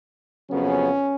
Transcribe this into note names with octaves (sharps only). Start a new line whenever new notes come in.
F2 C#3 F#3 B3 C#4